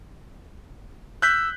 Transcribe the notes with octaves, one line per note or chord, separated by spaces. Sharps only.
E6 F#6 G6 B6